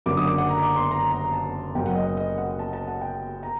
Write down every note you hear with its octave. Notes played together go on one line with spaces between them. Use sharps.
F#1 F#2 D3 D6
D#6
D6
F#5
A#5
D6
C6
A#5
A#5
A5
F#1 F#2 F#3 G5
F#5
D#5
D#5
D#5
F#5
A5
A5
F#5
G5
A#5